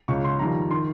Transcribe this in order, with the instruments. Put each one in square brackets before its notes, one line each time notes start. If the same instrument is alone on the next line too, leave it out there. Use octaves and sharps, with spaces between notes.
[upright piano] C#2 C#3 G#3 C#6
C6
F2 D#3 G3 A#5
D#3 C6